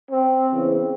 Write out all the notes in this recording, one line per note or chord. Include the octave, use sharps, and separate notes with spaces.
C4
E2 C#3 E3